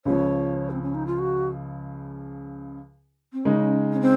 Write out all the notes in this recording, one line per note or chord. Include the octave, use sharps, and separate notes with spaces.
C#2 C#3 F3 C#5
C4
C#4
D#4
F4
F#4
C4
C#3 G#3 C#4 D#4
C#4
C4